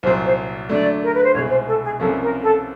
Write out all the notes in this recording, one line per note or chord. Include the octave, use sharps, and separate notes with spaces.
C2 A#2 F#3 C5
C5
D3 F#3 A3 D5
A#4
B4
C5
C2 B2 G#3 C#5
C5
A4
G#4
C2 C3 F3 A#3 C#4 A4
A#4
A4